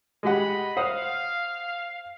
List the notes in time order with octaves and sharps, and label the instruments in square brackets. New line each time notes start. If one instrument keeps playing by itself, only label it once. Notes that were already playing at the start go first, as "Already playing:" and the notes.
[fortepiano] G#3 G4 F#5 [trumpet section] D#5 B5
[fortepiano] C5 F#5 D#6 [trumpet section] F5